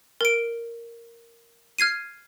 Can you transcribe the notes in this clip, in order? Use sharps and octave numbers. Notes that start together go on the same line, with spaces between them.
A#4 D7
F6 G#6 C7 D#7